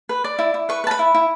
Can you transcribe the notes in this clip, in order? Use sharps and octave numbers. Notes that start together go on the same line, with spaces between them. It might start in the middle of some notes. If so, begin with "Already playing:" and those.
B4
D5
E4
E4
B4 C#6
B4 A5
B5
E4
E4